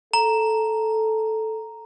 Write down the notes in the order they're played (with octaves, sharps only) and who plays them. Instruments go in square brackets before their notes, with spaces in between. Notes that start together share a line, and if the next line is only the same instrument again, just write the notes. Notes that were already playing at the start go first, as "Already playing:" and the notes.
[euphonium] A4 [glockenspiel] A#5